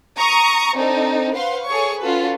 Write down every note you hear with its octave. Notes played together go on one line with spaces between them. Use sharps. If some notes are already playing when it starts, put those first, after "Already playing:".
A#5 C#6 D#6
C4 D4 D#4 A4
B4 C5 F5 F#5 C6
G#4 A4 C#5 C#6
C#4 F4 F#4 A4 B4